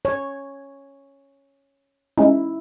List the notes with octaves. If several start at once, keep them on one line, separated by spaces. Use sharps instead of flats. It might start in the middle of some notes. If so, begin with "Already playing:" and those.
C#5
G#3 C#4 D#4 E4